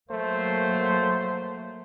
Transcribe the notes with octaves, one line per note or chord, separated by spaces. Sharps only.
F#3 A3 A#3 C5